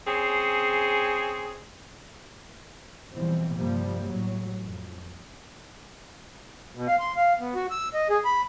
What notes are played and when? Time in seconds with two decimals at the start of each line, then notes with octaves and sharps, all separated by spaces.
0.07 C4 C#4 G#4
3.13 B2 E3 F3 G3 C4
3.55 G2 C3 F3 G3 A#3
4.08 A2 F#3
4.59 F2
6.76 B2
6.88 F5
6.99 C6
7.16 F5
7.40 B3
7.55 F#4
7.70 E6
7.94 D#5
8.10 G#4
8.25 B5